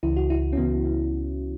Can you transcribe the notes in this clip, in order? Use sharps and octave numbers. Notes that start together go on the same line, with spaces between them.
C#2 C#3 E3 E4
F#4
E4
C#4
C#2 C#3 E3 B3
B3